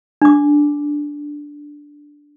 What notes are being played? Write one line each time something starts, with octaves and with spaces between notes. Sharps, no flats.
D4 D6